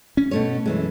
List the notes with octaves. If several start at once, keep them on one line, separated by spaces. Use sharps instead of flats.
C#4
B2 A3 C#5
F#2 E3 G#3